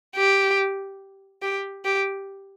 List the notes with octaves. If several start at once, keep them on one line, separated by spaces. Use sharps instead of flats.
G4
G4
G4